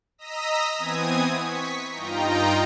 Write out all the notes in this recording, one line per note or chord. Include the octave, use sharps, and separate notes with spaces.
D#5 A#5 D#6 E6 A#6 B6
E3 B3 C4 G#5 D#6 G#6
C#6 B6
G2 D#4 F4 D#5 G5 A#5